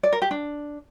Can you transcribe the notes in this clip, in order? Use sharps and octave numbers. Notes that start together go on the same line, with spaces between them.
D5
A#4
G4
D4